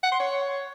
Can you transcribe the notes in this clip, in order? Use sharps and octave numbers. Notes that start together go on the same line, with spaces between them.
F#5
C6
C#5